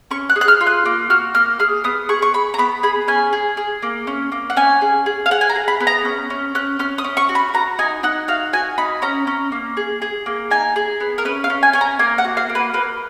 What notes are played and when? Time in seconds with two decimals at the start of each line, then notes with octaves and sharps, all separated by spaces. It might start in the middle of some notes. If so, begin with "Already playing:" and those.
0.11 C#4 C#6
0.30 F#6
0.36 G#4
0.41 F#6
0.48 F6
0.61 F4
0.67 F#6
0.85 A#3
1.10 F#4 F6
1.35 A#3 F6
1.59 G#4 F6
1.84 B3 D#6
2.09 G#4 C#6
2.22 C#6
2.34 G#4 B5
2.54 A#5
2.58 B3 B5
2.83 G#4 B5
3.08 C#4 G#5
3.33 G#4
3.57 G#4
3.82 A#3
4.07 C#4
4.32 A#3
4.50 F#5
4.57 C#4 G#5
4.81 G#4
5.06 G#4
5.26 F5
5.31 G#4 F#5
5.41 G#5
5.50 A#5
5.56 G#4
5.68 B5
5.80 B3
5.87 A#5
6.05 C#4
6.30 C#4
6.55 C#4 F#6
6.79 C#4 F6
6.98 D#6
7.04 C#4
7.17 C#6
7.29 F#4
7.35 B5
7.54 F#4 A#5
7.79 D#4 G#5
8.03 D#4 F#5
8.28 F#4 F5
8.53 F#4 G#5
8.78 D#4 B5
9.02 C#4 A#5
9.27 C#4
9.52 A#3
9.77 G#4
10.02 G#4
10.26 A#3
10.51 D#4 G#5
10.76 G#4
11.00 B3
11.18 A#4
11.25 C#4 B4
11.44 F5
11.50 C#4
11.63 G#5
11.73 C#4 G#5
11.81 A#5
11.99 A#3 G#5
12.18 F#5
12.25 F#4
12.37 F5
12.49 A#3
12.55 B4
12.74 A#3 B4